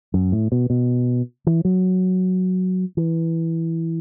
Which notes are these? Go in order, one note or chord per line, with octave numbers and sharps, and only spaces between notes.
F#2
A2
B2
B2
E3
F#3
E3